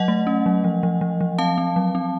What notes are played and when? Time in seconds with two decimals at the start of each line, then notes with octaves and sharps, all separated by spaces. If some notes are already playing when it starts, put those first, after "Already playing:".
Already playing: F#3 D#5 F#5
0.08 A3
0.27 C#4
0.46 F#3
0.64 F3
0.83 F3
1.01 F3
1.21 F3
1.39 C4 F5 A5
1.58 C4
1.76 F#3
1.95 C4